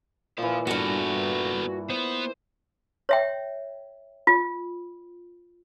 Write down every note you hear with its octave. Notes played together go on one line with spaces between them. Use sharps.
A#2 E3 C5 F5
G2 B3 F#4 A4 F#5
B3 C5
C#5 E5 G5
F4